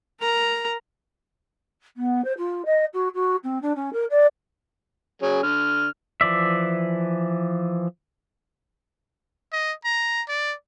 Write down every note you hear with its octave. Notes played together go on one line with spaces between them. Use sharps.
A#4 A#5
B3
C5
F4
D#5
F#4
F#4
C4
D4
C#4
A#4
D5
F#3 C#4 G#4
D3 F6
E3 F3 D5 E5
D#5
A#5
D5